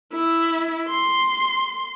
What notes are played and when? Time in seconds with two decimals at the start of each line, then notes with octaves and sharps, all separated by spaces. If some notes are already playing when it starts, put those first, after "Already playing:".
0.13 E4
0.89 C6